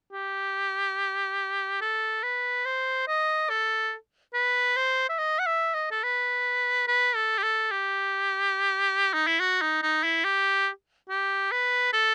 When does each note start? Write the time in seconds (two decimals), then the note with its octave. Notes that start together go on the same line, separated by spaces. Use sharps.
0.12 G4
1.81 A4
2.23 B4
2.65 C5
3.08 D#5
3.50 A4
4.34 B4
4.77 C5
5.09 E5
5.19 D#5
5.39 F#5
5.46 E5
5.74 D#5
5.91 A4
6.03 B4
6.88 B4
7.15 A4
7.38 G4
7.43 A4
7.71 G4
9.14 D#4
9.27 E4
9.40 F#4
9.61 D#4
9.83 D#4
10.04 E4
10.24 G4
11.09 G4
11.52 B4
11.93 A4